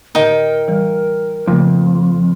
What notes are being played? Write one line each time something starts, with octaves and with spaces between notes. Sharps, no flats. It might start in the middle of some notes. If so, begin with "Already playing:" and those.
A2 D3 D#4 A#4 G5 D#6
E3 G3
F2 C#3 A3 A#3